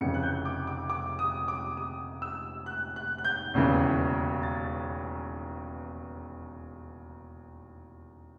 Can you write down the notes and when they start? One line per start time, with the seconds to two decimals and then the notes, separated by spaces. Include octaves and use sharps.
0.01 F1 F2 C#3 E3 C#7
0.14 F#6
0.23 G6
0.45 D6
0.67 D6
0.90 D6
1.19 D#6
1.48 D6
1.77 D#6
2.22 E6
2.66 F#6
2.96 F#6
3.18 F#6
3.24 G6
3.54 E1 D#2 C#3 E3
4.43 A6